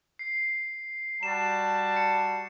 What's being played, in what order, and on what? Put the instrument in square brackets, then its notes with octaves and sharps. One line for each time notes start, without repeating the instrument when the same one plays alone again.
[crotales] C7
[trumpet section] G3 F#4 A5 [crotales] E7
[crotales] C#7